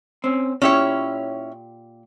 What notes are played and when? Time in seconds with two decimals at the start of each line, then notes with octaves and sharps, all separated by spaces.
0.24 C4 C#4
0.62 A#2 C#4 E4 G4 C#5